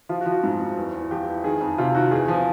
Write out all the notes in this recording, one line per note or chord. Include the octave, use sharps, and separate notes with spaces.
F3 F4
F#4
F3
F#4
G#2
G#2
E2
E2
F3 G4
E2
D#3 G#4
F2
C3 F4
D#3 F#4
E2 G#4
F3